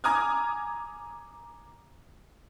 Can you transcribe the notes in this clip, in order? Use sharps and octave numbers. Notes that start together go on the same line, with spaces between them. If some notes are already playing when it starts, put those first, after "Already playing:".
G#5 A#5 D6 D#6 F6 G#6